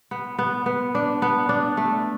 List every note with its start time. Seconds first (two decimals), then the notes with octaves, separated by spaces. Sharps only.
0.11 B3
0.39 B3
0.66 B3
0.95 D4
1.22 B3
1.49 D4
1.77 A3